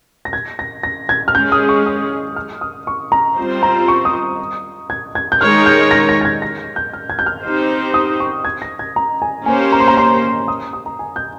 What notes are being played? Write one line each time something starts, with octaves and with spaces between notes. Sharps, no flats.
A#6
G#6
A#6
A#6
G#6
F6
G#3 C#4 G#4 G6
D#6
C#6
D#6
F6
D#6
C#6
A#5
G3 C4 F4 C5
A#5
C#6
D#6
G#6
G#6
G6
D#3 G#3 D#4 A#4 C#5 F6
G6
A#6
A#6
A#6
G#6
A#6
G6
F6
G#6
G6
F6
C4 D#4 G4 C5
D#6
C#6
G#6
A#6
G#6
A#5
G#5
A#3 C#4 G4 C5 G#5
A#5
C6
A#5
C6
D#6
D#6
A#5
G#5
G6